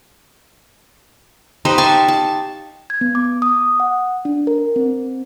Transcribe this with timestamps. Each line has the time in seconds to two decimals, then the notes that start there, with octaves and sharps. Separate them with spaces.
1.65 D#4 G4 B4 C5
1.78 F5 A5 C6 C#6
2.08 A5
2.90 G#6
3.01 B3
3.15 D6
3.42 D#6
3.80 F#5
4.25 D4
4.47 A#4
4.76 C4